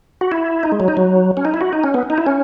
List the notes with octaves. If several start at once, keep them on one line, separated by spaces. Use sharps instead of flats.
F#4
E4
D#4
G#3
F#3
D#4
F#3
C#4
D#4
E4
F#4
D#4
C#4
B3
D#4
E4
C#4